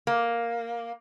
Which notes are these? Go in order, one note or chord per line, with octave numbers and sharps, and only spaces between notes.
A#3